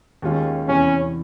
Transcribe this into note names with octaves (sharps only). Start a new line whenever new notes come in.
D#2 D#3 G#3 C#4 F4
E2 C3 E3 C#4